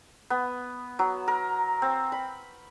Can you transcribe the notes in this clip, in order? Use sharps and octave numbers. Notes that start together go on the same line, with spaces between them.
B3
F#3
A#4
C4
B5